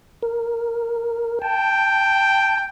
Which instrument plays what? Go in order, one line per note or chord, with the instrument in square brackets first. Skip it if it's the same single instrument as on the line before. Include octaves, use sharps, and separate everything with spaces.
[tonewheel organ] A#4
[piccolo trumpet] G5 [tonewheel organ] A5